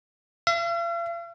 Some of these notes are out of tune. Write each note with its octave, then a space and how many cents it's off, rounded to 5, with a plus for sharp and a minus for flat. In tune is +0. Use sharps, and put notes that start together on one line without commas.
F5 -45